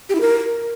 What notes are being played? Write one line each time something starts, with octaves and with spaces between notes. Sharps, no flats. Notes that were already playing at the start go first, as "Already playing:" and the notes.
G4
E4
A#4